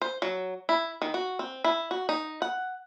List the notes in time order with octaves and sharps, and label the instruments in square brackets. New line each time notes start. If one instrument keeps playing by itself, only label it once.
[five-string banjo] C5
F#3
E4
D#3
F#4
C4
E4
F#4
D#4
F#5